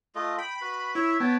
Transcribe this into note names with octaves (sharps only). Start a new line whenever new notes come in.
A3 F4 D#5
G5 B5
F#4 B4
E4 C#5 E5
B3 C#5 G5 A5